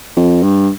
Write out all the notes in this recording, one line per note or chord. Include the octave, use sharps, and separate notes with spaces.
F2
G2